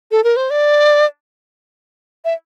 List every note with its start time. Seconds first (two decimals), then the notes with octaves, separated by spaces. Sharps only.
0.11 A4
0.24 A#4
0.36 C5
0.50 D5
2.25 E5